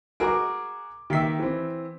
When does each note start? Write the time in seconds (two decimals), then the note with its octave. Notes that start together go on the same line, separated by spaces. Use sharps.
0.20 F#4 G#4 A#4 D6 D7
1.10 D#3 A#3 G4 E5 B6
1.39 E3 C4